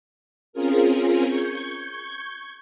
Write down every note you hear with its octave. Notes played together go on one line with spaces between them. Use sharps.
C4 C#4 F4 G#4 A#4
C#6 G6 G#6